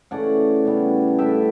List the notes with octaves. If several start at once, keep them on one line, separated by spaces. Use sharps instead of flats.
C#3 E3 A3 C#4 D5 F#5
C#3 G3 B3 E4
A2 G3 D4 E5 G5